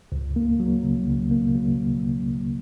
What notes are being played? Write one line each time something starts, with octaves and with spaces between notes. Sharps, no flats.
C#2
A#3
F#3
C#3
C#2
A#3
F#3